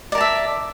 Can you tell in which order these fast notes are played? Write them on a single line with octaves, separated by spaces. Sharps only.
D5 A#4 A5 E5